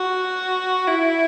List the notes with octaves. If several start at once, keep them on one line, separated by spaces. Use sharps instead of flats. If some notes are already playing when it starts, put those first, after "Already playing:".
Already playing: F#4
E4